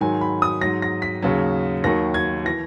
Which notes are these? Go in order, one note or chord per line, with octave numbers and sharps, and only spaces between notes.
G#2 D#3 F#3 G#5
B5
D#6
G#2 F#3 A#6
A#6
B6
D#2 C#3 F#3
D#2 D#3 F#3 A#6
G#6
E3 A#6